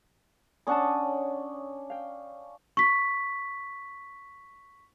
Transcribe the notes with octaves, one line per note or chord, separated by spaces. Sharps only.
C#4 D4 C#5 F#5 A5 D#6
F5 G5
C#6 B6